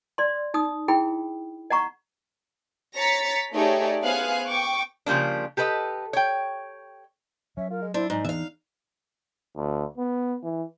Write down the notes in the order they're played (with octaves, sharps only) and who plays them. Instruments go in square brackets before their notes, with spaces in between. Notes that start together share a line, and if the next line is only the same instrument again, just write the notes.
[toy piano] D5 C6
D#4 D#6
E4 G#4 G5 B5
D#5 F#5 A#5 C#6
[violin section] C#5 A#5 A6 B6 C#7
A3 D#4 G4 G#4 C#5 D5
B3 G#4 C5 F5 G#5 F#6
G5 C#6 D6
[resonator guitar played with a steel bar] C#3 F3 G3 A#3 D4
G4 A4 B4 C#5 D#5
C#5 G5
[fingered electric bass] F#3 [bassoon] C#4 [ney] E5
[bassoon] F4 [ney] A#4
[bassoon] G#3
[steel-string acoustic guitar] D4 [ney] E4 [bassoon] C5
[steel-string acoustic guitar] G#2 [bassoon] G#3 [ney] D#4
[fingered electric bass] E3 B3 [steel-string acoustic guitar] E5 F5
[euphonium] D2
B3
E3